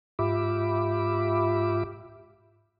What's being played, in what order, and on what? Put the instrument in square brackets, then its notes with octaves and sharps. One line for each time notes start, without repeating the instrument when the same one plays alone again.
[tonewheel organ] G#2 F4 G4 E5 B5 D6